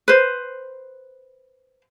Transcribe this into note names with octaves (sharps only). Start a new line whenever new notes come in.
B4 C5